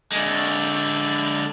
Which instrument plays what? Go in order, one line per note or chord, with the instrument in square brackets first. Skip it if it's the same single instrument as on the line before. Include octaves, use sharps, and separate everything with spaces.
[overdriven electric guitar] D3 G#3